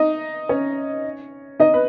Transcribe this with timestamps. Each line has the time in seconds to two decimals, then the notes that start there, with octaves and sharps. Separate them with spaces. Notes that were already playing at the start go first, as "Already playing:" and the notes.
Already playing: D#4 D#5
0.49 C#4 C#5
1.60 D#4 D#5
1.74 B4